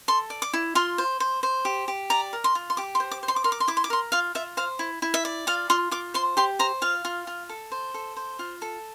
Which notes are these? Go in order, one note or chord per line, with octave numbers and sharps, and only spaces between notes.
A4 C6
D5
D6
E4
F4 C6
C5
C5
C5
G4
G4
D5 A#5
A#4
C6
F4
C6
G4 D6
C6
C5
D6
C5
C6
D6
A#4 C6
D6
C6
E4 D6
C6
D6
A#4 C6
F4 F5
F4 E5
C5 F5
E4
E4
E5
D5
F4 F5
F4 C6
F4 D6
C5 C6
G4 C6
C5 A#5
F4 F5
F4
F4
A4
C5
A4
C5
F4
A4